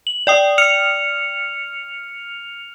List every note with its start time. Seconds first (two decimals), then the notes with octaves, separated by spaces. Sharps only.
0.07 F#7
0.27 D5 G5 D#6
0.58 F6 C#7 F7